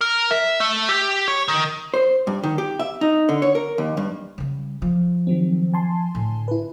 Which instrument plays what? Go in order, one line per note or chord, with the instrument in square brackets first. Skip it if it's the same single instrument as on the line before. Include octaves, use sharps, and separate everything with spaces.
[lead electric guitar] A#4
E5
A3
G4
C#5
D#3
[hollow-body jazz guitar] C5
G2
D#3
G4
E5
D#4
D3
C#5
A#4
D#2
G2
[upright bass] C#3 G3
F3
[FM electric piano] D#3 F#3 C4
G#5 A5 C6
[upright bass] A2 D3
[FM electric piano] E4 B4